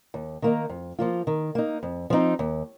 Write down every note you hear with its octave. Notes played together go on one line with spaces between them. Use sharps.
D#2
D#3 A#3 D#4
F2
F3 A#3 F4
D#3
A#3 D#4
F2
F3 C4 D#4
D#2